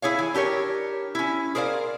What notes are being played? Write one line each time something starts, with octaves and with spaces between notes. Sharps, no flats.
E4 G#4 C#5 F5
E3
D4 G4 A#4 C#5
C#4 E4
G#4 A#4 C5 D5 F5